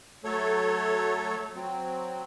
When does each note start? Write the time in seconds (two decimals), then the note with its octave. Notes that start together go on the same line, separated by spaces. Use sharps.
0.24 F#3 A3 A4 C#5
1.56 F#3 C4